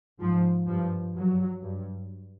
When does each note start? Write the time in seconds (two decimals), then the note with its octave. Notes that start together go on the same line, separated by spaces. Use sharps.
0.20 G#2 F3
0.67 G2 F3
1.14 G2 F#3
1.63 G2